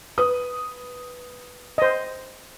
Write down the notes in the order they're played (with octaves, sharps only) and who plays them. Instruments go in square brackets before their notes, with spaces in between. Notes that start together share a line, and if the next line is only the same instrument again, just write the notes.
[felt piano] B4 D#6
[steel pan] C5 D#5